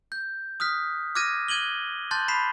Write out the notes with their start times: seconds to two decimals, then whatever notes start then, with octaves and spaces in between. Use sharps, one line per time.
0.12 G6
0.60 D#6 F6 F#6 B6
1.15 D6 F6 F#6 G#6 A#6 D#7
1.48 F#6 G#6 D#7 F#7 G7
2.11 A5 C6 F#6 G6 A6
2.28 B5 B6 C7 E7